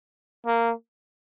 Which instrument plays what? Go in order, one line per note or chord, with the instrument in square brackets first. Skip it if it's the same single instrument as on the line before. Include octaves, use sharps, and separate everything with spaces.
[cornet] A#3